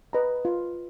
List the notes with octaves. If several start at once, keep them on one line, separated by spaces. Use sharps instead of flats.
B4 D#5 A#5
F4